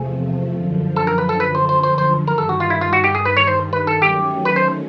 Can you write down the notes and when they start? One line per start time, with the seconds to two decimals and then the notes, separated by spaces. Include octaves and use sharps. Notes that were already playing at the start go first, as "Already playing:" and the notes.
Already playing: E2 C3 F3 A3 G#4
0.53 F#2 D3 F3
0.96 A4
1.07 A#4
1.18 B4
1.29 A4
1.40 B4
1.55 C5
1.69 C5
1.83 C5
1.98 C5
2.27 G2 D#3 G3 A#4
2.38 A4
2.49 F#4
2.60 F4
2.70 E4
2.81 F4
2.93 F#4
3.04 G4
3.15 G#4
3.25 B4
3.37 C#5
3.48 C5
3.73 B4
3.87 A4
4.01 D#3 F#3 A3 C#4 G4
4.45 B4
4.56 C5